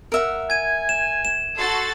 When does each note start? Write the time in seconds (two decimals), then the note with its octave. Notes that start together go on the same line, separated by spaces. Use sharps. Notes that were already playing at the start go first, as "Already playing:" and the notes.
0.12 A#4 E5 F#5
0.50 G#5 G#6 D#7
0.89 E7
1.25 E7
1.58 F#4 A4 C6 A6